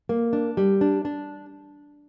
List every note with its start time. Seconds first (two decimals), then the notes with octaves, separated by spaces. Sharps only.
0.09 A#3
0.33 D4
0.57 G3
0.81 D4
1.05 D4